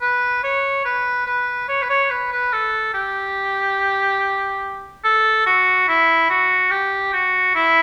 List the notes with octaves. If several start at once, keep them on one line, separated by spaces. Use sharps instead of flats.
B4
C#5
B4
B4
C#5
B4
C#5
B4
B4
A4
G4
A4
F#4
E4
F#4
G4
F#4
E4